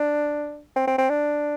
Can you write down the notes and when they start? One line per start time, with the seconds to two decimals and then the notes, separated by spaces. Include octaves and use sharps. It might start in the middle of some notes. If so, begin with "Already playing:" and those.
Already playing: D4
0.76 C4
0.87 C4
0.98 C4
1.10 D4